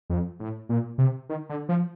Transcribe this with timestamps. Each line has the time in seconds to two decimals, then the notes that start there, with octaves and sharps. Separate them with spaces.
0.10 F2
0.40 A2
0.69 A#2
0.98 C3
1.29 D#3
1.49 D3
1.69 F3